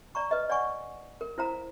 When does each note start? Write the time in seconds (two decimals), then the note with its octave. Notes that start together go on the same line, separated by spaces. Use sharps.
0.15 D5 A#5 C#6
0.31 B4 D#5
0.50 D5 F#5 G#5 C#6
1.21 A#4
1.38 E4 C5 F5 A#5